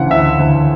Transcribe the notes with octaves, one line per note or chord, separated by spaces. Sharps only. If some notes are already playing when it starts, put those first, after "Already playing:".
Already playing: D2 C#3 E3 F#5
D2 E5
D2